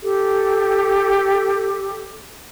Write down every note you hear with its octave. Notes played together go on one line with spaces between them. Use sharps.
G4 A4